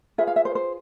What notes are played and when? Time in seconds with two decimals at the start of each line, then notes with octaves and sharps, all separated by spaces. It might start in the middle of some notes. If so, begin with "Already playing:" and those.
0.18 F4 G#4 B4 E5
0.27 F5
0.36 E5
0.45 C5
0.55 C5